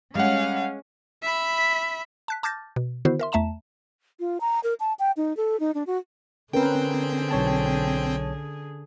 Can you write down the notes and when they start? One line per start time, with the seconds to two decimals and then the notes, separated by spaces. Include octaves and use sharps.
0.15 G3 G#3 C#4 F5 F#5
1.23 E5 B5
2.28 A5 F#6 B6
2.43 A5 D6 F6 G6 A6 A#6
2.76 B2
3.05 D3 D#3 B3 E4 F#4 C5
3.19 A#4 E5 C6
3.32 E2 A3 E5 A5 A#5 E7
4.20 F4
4.41 A#5
4.64 A#4
4.80 A5
4.99 G5
5.17 D#4
5.37 A4
5.60 D#4
5.75 D4
5.87 F#4
6.53 D3 C4 C#4 G#4 A#4 B4 G5
7.31 B1 C#5 A5